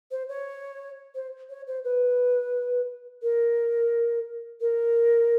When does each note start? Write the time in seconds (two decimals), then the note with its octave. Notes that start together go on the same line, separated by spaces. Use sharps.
0.11 C5
0.28 C#5
1.14 C5
1.49 C#5
1.66 C5
1.84 B4
3.22 A#4
4.60 A#4